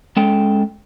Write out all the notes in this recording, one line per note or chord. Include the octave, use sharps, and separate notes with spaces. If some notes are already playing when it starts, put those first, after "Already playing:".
G#3 C#4 A4 G5